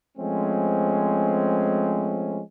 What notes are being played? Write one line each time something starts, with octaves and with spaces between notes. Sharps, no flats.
F3 G#3 A3 C4 C#4